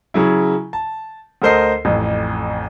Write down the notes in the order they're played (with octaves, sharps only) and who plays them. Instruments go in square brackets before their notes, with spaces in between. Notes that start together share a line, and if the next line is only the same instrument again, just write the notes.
[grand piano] C#3 F#3 E4
A5
D2 A4 A#4 C5 D#5 C7
A1 F2